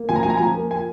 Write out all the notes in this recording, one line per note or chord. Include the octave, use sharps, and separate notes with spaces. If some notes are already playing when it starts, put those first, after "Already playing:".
Already playing: A#3
F3 G#5
A#5
F3 G#5
A#5
F3 G#5
A#3
G#5